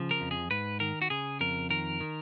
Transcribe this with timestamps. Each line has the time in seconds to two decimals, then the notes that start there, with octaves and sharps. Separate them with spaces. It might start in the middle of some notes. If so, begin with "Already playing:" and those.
Already playing: C#3 F3
0.11 A#4
0.21 F2
0.31 G#4
0.51 G#2 B4
0.80 D#3 A#4
1.02 F#4
1.10 C#3 G#4
1.41 F2 A#4
1.70 D#3 A#4
2.01 D#3